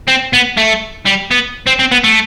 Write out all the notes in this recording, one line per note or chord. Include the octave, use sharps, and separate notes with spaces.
C4
B3
A3
G3
B3
C4
C4
B3
A3